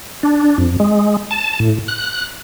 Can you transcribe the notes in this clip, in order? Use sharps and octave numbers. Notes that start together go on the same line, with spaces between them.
D4
F2
G#3
A5
A2
F#6